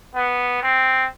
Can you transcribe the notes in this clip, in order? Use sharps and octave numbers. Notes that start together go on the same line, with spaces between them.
B3
C4